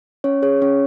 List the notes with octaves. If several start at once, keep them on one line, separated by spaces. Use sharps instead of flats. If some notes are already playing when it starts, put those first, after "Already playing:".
C#4 C#5
G#4 C#5
C#4 C#5